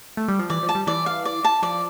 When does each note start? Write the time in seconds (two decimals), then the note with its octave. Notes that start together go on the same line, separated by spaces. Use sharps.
0.17 A3
0.28 G3
0.39 F3
0.50 E3 D5
0.63 F3
0.69 A5
0.75 G3
0.87 E3 D5
1.06 F5
1.25 D5
1.44 A5
1.63 F3 D5